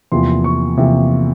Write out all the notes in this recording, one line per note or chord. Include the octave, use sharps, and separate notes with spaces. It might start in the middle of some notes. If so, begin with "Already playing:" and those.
E2 C3 F3 A#3 C6
C#6
E2 C3 F3 A#3